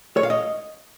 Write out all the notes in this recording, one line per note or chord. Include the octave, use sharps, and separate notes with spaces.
C#5
F5
D#5